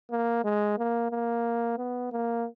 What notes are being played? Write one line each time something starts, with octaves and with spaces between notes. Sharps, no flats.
A#3
G#3
A#3
A#3
B3
A#3